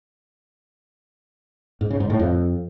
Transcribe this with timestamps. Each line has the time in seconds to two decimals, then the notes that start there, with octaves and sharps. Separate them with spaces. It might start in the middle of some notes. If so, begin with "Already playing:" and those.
1.81 G#2
1.90 C#3
2.00 G#2
2.10 A2
2.19 F2